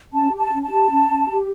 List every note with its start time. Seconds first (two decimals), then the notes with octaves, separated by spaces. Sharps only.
0.13 C#4 A5
0.32 G4
0.39 A5
0.52 C#4
0.64 A5
0.71 G4
0.90 C#4
1.10 C#4
1.29 G4